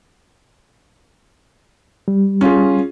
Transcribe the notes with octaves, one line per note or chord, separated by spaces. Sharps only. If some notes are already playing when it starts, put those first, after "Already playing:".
G3
C#4 F4 G#4